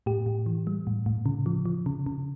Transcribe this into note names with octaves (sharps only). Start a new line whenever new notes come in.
A2 G4
A2
E3
G3
A2
A2
C#3
F3
F3
C#3
C#3